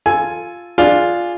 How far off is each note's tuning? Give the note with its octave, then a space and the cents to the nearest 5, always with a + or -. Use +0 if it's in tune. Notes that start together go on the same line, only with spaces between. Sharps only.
F4 +0 A4 +0 G#5 +5
D4 +0 F4 +0 G#4 +0